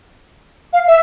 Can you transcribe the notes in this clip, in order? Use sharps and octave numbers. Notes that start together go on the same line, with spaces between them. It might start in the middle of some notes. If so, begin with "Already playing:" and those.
F5
E5